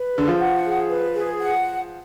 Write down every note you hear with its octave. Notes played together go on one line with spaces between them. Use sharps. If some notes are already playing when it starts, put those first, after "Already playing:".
Already playing: B4
D3 G#4
F3
F#5
G#4
B4
G#4
F#5